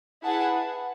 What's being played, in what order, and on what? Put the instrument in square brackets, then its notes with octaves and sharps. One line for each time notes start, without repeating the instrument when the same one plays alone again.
[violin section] E4 G#4 B4 F#5 A5